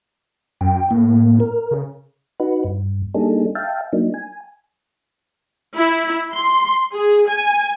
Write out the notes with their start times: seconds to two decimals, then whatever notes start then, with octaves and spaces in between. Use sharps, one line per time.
0.61 F#2 G5
0.90 A2 A#3
1.40 A#4
1.71 C#3
2.40 D#4 F#4 B4
2.64 G2
3.15 G3 A#3 D4 D#4 G#4 A4
3.55 E5 F5 G5 A5
3.93 F#3 A#3 D4 D#4
4.14 G#5
5.77 E4
6.33 C6
6.92 G#4
7.28 G#5